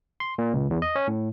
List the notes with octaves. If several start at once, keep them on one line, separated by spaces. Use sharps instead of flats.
C6
A#2
C#2
E2
D#5
C#4
A2